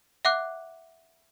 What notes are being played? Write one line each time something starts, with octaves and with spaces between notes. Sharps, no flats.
E5 F#5 D6 F#6